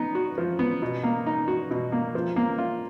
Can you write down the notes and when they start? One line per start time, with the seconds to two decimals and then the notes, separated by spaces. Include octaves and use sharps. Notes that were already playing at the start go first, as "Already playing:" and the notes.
Already playing: B3 D#4
0.15 F#4
0.38 F3
0.59 B3
0.82 B2
1.03 A#3
1.26 D#4
1.48 F#4
1.71 B2
1.92 A#3
2.15 F3
2.36 A#3
2.58 F4